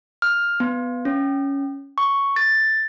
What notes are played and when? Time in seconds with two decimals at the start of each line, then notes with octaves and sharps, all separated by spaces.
0.22 F6
0.60 B3
1.05 C#4
1.98 C#6
2.36 A6